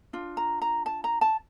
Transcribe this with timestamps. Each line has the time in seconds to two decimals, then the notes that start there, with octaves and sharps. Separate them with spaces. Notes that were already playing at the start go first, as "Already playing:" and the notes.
0.13 D4 F4
0.37 A#5
0.62 A#5
0.86 A5
1.04 A#5
1.21 A5